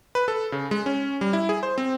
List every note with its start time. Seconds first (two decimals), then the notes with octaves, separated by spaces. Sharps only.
0.15 B4
0.28 A4
0.52 C#3
0.71 G#3
0.86 C#4
1.21 G3
1.33 E4
1.49 G#4
1.63 C5
1.78 C4